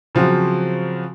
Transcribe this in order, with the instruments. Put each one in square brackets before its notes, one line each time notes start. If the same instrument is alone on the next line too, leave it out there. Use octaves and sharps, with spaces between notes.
[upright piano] C#3 F3 F#3 C4 F#4